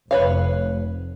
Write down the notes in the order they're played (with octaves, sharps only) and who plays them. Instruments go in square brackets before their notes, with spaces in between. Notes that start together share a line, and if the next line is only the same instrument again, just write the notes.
[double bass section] F1 [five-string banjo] B4 C#5 F5